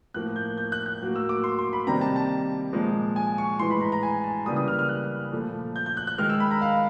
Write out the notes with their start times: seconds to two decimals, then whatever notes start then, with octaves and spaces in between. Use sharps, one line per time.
0.14 A2 F3 A#3 F#6
0.36 G6
0.58 G6
0.72 F#6
0.86 F#6
1.01 A2 F#3 A#3
1.16 E6
1.29 D6
1.44 C6
1.58 C6
1.73 B5
1.87 C3 D#3 G3 A#3 A#5
2.01 A5
2.16 A5
2.73 A#2 F3 G#3
3.16 G#5
3.38 C#6
3.59 A2 E3 G#3 C6
3.70 B5
3.81 A#5
3.92 A#5
4.03 G#5
4.24 A5
4.46 C#3 E3 G3 A#3 D#6
4.56 D#6
4.68 F6
4.79 F6
4.89 F#6
5.32 A#2 F3 A3
5.76 G6
5.86 G6
5.97 F#6
6.07 F#6
6.18 D#3 G#3 F6
6.30 E6
6.40 B5
6.51 A#5
6.62 F5